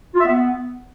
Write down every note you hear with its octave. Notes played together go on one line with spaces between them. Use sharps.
F4
E5
B3